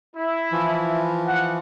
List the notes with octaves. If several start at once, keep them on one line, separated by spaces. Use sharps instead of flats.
E4
E3 F3
F#5